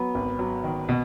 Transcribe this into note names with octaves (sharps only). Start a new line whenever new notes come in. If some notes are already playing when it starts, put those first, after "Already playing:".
Already playing: F#3 B3
G#1
F#3
D#3
B2